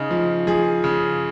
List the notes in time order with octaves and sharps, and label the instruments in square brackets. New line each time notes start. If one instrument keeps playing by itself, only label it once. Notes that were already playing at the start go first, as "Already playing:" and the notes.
Already playing: [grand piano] C#3 D#4
F3
F3 G#4
C#3